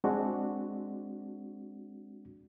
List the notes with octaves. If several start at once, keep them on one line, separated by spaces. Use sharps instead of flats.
G#3 C4 D4 F#4